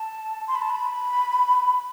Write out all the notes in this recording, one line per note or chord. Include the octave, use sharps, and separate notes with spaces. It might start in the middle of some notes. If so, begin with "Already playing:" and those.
Already playing: A5
C6
B5
A5
B5